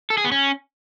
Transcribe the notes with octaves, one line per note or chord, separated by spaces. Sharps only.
A4
G#4
B3
C#4